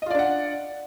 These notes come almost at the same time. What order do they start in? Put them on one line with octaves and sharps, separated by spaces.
D#5 F4 D5 D4 F#5